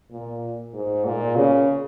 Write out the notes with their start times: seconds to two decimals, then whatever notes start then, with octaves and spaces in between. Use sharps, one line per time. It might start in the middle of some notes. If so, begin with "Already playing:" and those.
0.12 A#2
0.74 G#2
1.05 A#2
1.36 C#3